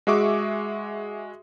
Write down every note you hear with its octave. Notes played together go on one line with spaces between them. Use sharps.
G#3 F#4 G#4 E5 C#6 D6